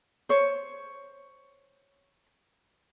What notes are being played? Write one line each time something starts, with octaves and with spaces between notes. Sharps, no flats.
C5 C#5